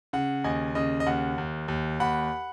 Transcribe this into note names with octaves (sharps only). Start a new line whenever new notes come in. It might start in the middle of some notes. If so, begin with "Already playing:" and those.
C#3 F#5
D#2 D#5 G#5
C#3 D#5
D#5
D#2 F#5
D#2
D#2
D#2 F#5 B5